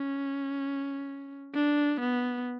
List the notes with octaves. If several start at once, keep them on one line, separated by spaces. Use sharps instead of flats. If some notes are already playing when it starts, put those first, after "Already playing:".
Already playing: C#4
D4
B3